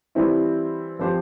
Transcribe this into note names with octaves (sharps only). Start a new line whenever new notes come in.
E3 G3 C4 E4
F3 C4 G4 C5